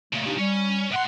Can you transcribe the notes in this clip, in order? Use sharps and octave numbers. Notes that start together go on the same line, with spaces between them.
A#2 C#3 A3
D4 D#4 G4
G3 C#4
A2 F#5 C6